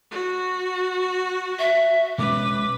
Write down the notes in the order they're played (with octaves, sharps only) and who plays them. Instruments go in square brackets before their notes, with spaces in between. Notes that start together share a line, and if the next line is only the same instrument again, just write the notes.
[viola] F#4
[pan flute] E5
[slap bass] B2 G#3 C#4 [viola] B4 [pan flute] D6